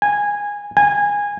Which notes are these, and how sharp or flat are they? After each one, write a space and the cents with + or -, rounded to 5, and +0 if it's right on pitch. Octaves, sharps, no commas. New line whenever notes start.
G#5 -15
G#5 -20